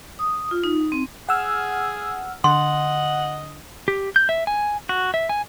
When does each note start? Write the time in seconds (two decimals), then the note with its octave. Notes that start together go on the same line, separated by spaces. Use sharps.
0.19 D#6
0.51 F4
0.64 D#4
0.92 C4
1.29 G#4 F#5 E6 F6
2.44 D3 D#5 F#5 C6
3.88 G4
4.16 G6
4.29 E5
4.47 G#5
4.89 F#4
5.14 E5
5.29 G#5